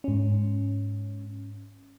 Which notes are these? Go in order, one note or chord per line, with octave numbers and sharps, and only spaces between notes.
G#2 C#4